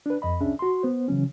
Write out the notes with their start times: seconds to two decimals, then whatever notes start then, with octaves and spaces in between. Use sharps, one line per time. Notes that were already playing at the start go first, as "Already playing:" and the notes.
0.06 D4 B4
0.22 F2 D#5 B5
0.40 C2 C#4 D4 G#4 E5
0.59 F#4 C6
0.83 B3 C5
1.08 C#3 E3 F#3 C#4